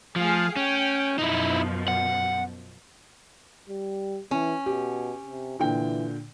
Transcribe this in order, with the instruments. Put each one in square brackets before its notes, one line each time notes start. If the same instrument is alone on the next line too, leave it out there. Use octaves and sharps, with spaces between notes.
[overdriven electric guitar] F3 [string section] A3 G#4 F5
[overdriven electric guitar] C#4 [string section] G5
[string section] F#2 B2 F3 [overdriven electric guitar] D#4 E4
[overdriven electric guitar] F#5
[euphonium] G3
[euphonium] E3 [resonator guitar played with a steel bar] C#4
[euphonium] B2 [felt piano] G4
[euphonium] C3
[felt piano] A#2 D3 G5 [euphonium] E3